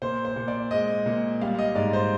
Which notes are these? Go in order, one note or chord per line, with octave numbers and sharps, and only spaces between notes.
A#2 C5
C5
A#2
D5
G#3 D#5
A#2
G3 F5
D#5
G#2 D5
C5